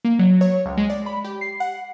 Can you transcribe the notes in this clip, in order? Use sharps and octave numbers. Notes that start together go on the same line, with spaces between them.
A#3
F#3
C#5
C#2
G#3
D5
B5
G4
C7
F#5